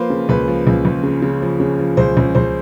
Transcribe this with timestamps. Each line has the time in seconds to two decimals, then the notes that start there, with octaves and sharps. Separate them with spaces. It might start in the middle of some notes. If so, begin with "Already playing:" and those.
Already playing: F3 A#3 B4 C5
0.10 C#3
0.29 C#2 B4
0.48 F3
0.67 C#2
0.85 C#2
1.03 C#3
1.22 C#3
1.42 F3
1.60 C#3
1.79 F3
1.97 C#2 C5
2.17 C#2
2.35 C#2 C5